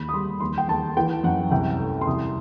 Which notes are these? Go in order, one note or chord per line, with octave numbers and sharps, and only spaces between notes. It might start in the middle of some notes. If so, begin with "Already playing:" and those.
Already playing: D#2 B5
D#6
G3 C6
D#2 C6
G5
D#2 A5
E3 G5
F#2 F#5
C2 G5
A3
C6
C2 D#6